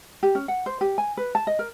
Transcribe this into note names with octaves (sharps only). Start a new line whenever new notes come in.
G4
C#4
F#5
C5
G4
G#5
B4
A5
D#5
A#4